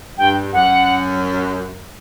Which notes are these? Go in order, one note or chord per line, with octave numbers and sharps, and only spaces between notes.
G2 G5
F#2 F#5